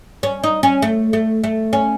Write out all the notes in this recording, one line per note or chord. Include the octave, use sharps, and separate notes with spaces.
C#4
D#4
C#4
A3
A3
A3
C#4